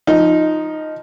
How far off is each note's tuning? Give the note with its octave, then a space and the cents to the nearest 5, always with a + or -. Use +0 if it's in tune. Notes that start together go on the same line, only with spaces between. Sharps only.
F3 +0 D#4 +0